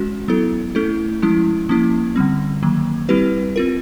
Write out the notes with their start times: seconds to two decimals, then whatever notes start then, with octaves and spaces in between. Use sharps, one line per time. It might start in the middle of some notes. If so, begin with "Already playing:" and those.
Already playing: G#3 C#4 F#4
0.28 F#3 B3 E4 A4
0.75 A3 C#4 E4 A4
1.22 F3 G#3 C#4 E4
1.69 F3 A#3 C#4 E4
2.16 D3 G3 C4
2.63 D#3 F#3 A#3
3.09 G3 C4 E4 G4 B4
3.56 C4 F4 A#4